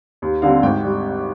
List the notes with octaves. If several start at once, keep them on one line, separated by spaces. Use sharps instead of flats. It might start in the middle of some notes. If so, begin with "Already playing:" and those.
D#2
D3 G3 C4 F5
G#1 G5
G3